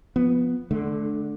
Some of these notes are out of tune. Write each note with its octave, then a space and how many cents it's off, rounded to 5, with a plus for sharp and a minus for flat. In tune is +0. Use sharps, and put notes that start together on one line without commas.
F3 +0 B3 +0
D3 +0 A3 -35